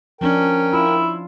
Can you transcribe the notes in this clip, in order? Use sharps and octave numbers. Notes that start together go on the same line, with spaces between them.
F3 C#4 D4 A#4 G5
E4 F4